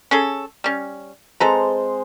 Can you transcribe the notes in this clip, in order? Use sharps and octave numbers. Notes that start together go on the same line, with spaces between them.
C#4 G#4 A4
G3 C#4
G#3 C4 A4 B4 C5 A#5